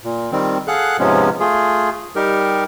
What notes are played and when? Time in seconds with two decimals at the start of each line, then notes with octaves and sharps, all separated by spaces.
0.05 A#2
0.32 D#3 G3 C4
0.68 G#4 A4 F5 F#5 F#6
0.99 G#2 C3 F3 G#3 B3 C#4
1.40 A3 F4 G#4
2.16 G3 D#4 G4 A#4